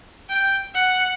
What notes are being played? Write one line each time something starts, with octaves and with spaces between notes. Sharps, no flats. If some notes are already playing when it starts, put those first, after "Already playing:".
G5
F#5